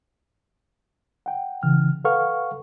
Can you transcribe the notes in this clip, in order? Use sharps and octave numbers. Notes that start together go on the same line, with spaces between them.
F#5 G5
C#3 E3 F6
A4 B4 F5 F#5 C#6 F6